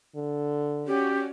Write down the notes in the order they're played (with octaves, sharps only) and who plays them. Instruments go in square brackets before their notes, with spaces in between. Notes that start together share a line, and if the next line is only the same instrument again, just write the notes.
[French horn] D3
[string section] C#4 F#4 D5 [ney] G4